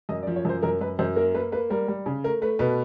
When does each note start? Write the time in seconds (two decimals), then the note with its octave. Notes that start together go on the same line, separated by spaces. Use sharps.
0.09 F#2 D#5
0.23 D5
0.27 F3
0.36 C#5
0.45 F#2 C5
0.62 F#2 A#4
0.81 F#2 B4
0.99 F#2 C5
1.16 A#3 A#4
1.34 A#3 B4
1.52 A#3 B4
1.70 G3 A#4
1.88 G3
2.06 C#3
2.24 A3 A#4
2.42 A3 B4
2.59 B2 B4